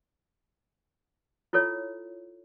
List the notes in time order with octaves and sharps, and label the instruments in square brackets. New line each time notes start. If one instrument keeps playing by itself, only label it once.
[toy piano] E4 F4 A4 C#5